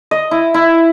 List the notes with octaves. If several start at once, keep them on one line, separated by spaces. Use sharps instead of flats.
D#5
E4
E4